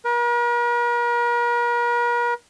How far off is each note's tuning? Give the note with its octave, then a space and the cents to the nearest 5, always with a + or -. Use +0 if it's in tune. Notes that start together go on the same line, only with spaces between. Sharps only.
A#4 +45